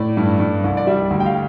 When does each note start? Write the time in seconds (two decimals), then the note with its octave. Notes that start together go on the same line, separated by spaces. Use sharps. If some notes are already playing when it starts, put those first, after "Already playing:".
Already playing: A2 D5
0.17 G2
0.40 G2
0.64 C2
0.77 D5
0.87 G3 E5
1.11 D2
1.20 G5
1.26 F5